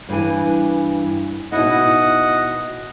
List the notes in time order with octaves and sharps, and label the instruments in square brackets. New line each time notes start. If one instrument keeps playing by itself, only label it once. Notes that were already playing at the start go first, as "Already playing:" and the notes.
[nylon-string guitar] G2 E3 G#5
[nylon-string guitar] B2 D#4 E4 [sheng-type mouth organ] D#5 F#5